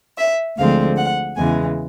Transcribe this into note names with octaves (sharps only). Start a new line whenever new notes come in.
E5
D2 D3 F3 G#3 C4 F5
F#5
E2 C#3 E3 G#3 G#5